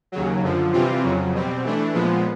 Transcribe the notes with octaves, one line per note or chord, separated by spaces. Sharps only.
D#2 C#3 F#3
F#2 D3 F3
C3 E3 G3 C4 F4
F2 C#3 F#3
B2 G3 C4
E3 A3 D4
A#2 F3 G#3 B3